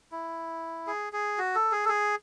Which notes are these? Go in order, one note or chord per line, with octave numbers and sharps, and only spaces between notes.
E4
G#4
G#4
F#4
A4
G#4
A4
G#4